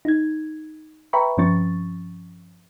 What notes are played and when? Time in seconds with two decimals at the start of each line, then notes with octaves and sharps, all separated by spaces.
0.05 D#4 G#6
1.13 B4 E5 G5 A#5 B5 C#6
1.37 G2 F3 C4 C#4 C#6 A6